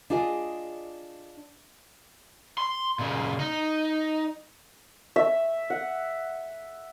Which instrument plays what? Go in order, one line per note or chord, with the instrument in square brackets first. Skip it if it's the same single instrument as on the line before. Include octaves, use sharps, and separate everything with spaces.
[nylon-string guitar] D4 F4 G#4 D5 D#5
[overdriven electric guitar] C6
A#2 C#3
D#4
[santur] E5
F#5